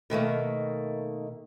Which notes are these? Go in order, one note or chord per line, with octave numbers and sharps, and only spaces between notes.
B2 D#3 A3 A#3